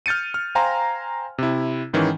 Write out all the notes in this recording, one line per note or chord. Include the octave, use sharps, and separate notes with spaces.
F6 G6 A6 C#7 D#7
F6
C5 F5 G5 G#5 A#5 C6
C3 E4
G#2 D#3 E3 C#4